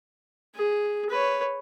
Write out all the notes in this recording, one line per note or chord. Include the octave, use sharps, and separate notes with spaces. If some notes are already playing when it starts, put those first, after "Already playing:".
G#4
B4 C#5